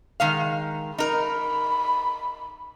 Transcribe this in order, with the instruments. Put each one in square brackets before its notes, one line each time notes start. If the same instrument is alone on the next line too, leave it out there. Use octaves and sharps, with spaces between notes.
[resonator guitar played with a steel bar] D#3 G#3 F5
[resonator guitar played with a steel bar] D#4 A#4 [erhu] B5